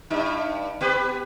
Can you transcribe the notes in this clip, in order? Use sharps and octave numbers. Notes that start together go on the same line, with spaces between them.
G2 D#4
B3 G4 B4